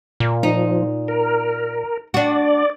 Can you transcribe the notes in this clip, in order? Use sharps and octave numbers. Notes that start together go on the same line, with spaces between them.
A#2
F3 D#4
A#4
D4 F#4 D5